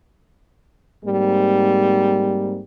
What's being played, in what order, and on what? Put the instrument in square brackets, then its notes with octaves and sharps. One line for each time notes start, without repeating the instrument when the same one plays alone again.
[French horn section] G#2 G3 A#3 C4